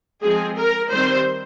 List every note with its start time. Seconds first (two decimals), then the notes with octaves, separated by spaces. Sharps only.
0.21 F3 G#3 C4 G#4
0.57 A#4
0.92 D#3 G3 C4 C5